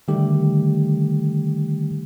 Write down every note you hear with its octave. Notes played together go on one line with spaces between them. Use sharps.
D3 D#3 G3 A3 G4